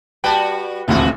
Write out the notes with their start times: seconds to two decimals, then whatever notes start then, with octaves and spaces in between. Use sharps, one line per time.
0.24 G3 F#4 B4 G5 A5
0.88 D#1 A1 D2 C3 F3 F#4